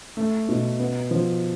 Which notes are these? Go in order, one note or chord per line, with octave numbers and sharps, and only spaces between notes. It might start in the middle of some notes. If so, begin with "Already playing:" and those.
A3
B2
B3
F3